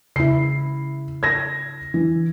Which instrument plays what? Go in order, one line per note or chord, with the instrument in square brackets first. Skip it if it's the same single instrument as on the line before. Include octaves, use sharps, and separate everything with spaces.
[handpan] C#3 E4 [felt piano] C7
[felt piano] G#6 A#6
E3